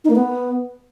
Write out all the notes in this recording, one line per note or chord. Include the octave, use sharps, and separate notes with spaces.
D#4
A#3
B3